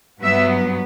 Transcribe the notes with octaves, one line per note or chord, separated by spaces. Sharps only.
G2 F#3 B3 E5